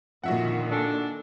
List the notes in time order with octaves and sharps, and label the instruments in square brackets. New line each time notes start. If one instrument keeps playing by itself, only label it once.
[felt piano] F2 F3 [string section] A#2 D3 D#3 [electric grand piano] F#4 E5 F#5
[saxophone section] D4 A4 [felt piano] D5 G#5